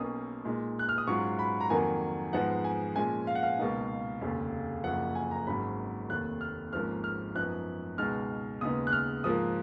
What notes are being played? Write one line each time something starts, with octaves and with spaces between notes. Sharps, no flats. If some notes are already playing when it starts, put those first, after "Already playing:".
Already playing: B1 B2 A#3 C#4 D#6
A#2 G#3 D#4
F#6
F6
D#6
G#2 F#3 C#4 F4 C#6
B5
A#5
F2 D#3 F#3 A#3 G#5
G#2 F3 G#3 B3 D#4 F#5
G#5
A#2 F3 G#3 C#4 G#5
F5
F#5
F5
C#2 B2 A#3 D#4
F1 D#2 C#3 G#3
F#1 F#2 F3 F#5
G#5
A#5
G#1 G#2 F#3 C#4 B5
F1 D#2 D#3 F#6
F6
G#1 G#2 F3 A#3 C#4 F6
F6
F#2 F3 B3 D#4 F#6
C#2 B2 G#3 D#4 F6
D#2 C#3 G#3 B3 D#4 D#6
F#6
F6
G#2 F3 A#3 F4 D#6